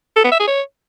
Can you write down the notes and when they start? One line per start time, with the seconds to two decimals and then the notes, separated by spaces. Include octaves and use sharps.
0.16 A4
0.24 B3
0.32 E5
0.40 G#4
0.48 C#5